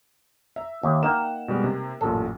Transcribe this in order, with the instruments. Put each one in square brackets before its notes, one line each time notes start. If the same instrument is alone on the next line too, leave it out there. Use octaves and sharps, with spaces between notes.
[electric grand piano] E5 [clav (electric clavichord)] A#5
[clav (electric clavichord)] D#2
[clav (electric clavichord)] A#3 D#4 G5 [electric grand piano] F#5 E7
[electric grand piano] B2 G3 G#3
C3
[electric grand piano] A1 F#2 A#2 [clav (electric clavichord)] A4